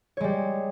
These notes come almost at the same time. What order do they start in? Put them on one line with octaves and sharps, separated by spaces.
C#5 G#3 G3